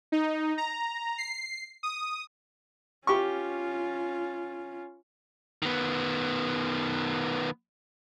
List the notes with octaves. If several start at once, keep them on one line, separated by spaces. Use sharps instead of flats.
D#4
A#5
C7
D#6
C#4 F4 G4 C#6
D#3 B3